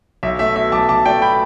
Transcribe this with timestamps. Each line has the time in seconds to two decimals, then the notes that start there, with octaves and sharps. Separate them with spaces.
0.23 B1 E5
0.39 A3 E5
0.55 B2 E5
0.72 B1 A5 D6
0.89 B1 A5 D6
1.06 A3 D5 G5
1.22 B2 G5 B5